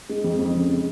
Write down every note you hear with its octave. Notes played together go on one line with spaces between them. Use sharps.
G#3
F2
F2
C#3
G#3